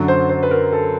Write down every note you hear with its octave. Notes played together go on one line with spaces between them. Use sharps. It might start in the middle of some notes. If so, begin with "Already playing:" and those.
Already playing: F#2 D3 F#3
C5
C5
B4
A#4
A4